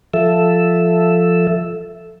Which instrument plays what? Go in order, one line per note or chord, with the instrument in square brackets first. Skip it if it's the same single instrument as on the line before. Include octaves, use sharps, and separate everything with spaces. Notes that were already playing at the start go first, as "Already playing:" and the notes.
[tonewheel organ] F3 A4 E5